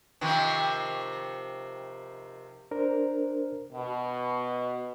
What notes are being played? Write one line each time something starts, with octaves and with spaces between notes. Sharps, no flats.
C3 D#3 F3
D4 A#4 C5
B2